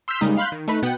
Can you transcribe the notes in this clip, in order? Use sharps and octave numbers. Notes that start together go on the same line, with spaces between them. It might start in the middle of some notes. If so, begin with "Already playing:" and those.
C6 E6 F6 G6 B6
C#3 G3 G#3 A#3 D#4
F5 B5 C6 F#6 G6
D#3
A3 D#4 B4 B5
B2 B3 F#5 G5